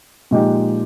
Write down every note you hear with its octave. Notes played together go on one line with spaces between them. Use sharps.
A#2 F3 G#3 D#4 G4